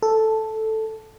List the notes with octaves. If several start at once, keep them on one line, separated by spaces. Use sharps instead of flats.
A4